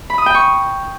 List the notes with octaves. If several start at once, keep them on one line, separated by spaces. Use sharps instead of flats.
B5
D#6
G5
C#6